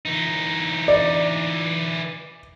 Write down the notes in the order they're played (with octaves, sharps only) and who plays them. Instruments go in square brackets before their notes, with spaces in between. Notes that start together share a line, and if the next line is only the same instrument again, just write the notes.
[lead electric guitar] E3 D#4
[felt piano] D5